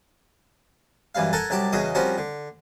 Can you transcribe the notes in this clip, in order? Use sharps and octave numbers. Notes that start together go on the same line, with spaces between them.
F#2 E3 G3 F5
A4 A#4 F#5 G#5 A5
C2 F#3 G4 A5 D6
E2 C#3 F#4 D#5 D#6
F3 G3 C4 C#4 F#4 A#4
D3